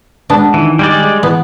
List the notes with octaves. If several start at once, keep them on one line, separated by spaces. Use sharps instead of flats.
G#3 B3 D4
D#3 E3
G3 G#3 D5
G#4
E3 B3